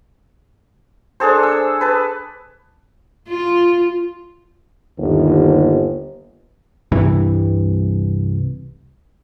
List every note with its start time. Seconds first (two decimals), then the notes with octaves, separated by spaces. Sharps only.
1.20 D4 G#4 A4 C5
1.43 E6
1.81 B4 A5
3.28 F4
4.98 G1 D#2
6.92 C2 G2 C3 E3